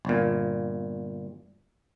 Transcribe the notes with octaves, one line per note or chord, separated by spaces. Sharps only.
G1 A#2